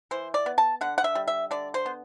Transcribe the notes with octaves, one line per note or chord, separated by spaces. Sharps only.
E3 C5
D5
B3
A5
D3 F#5
F#5
E5
G3
E5
D3 D5
C5
B3